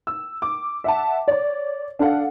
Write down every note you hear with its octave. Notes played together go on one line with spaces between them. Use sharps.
E6
D6
E5 F#5 A5
C#5 D5
D4 A4 F5 F#5